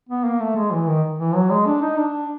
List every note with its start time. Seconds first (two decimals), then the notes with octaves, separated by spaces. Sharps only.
0.09 B3
0.24 A#3
0.40 A3
0.56 G#3
0.71 E3
0.87 D#3
1.19 E3
1.35 F#3
1.50 G#3
1.66 D4
1.82 D#4
1.97 D4